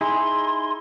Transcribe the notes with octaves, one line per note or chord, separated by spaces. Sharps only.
D#4 E4 G#4 C6